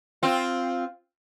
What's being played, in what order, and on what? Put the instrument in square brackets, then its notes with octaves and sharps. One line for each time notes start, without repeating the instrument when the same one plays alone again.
[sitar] C4 F4